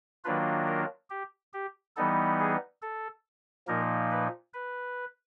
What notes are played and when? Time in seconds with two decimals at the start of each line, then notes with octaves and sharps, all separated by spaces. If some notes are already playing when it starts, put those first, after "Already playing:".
0.25 D#3 F#3 A#3 D4 F4 B4
0.67 A#4
1.10 G4
1.53 G4
1.96 E3 G3 B3 D#4 A4
2.40 G#4
2.82 A4
3.67 A#2 F3 A#3 D#4 A#4
4.11 B4
4.54 B4